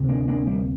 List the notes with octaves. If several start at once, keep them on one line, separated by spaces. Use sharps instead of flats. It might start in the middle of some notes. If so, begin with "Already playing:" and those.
Already playing: D2 C3
A#3 D4
A#3 D4
G3 A#3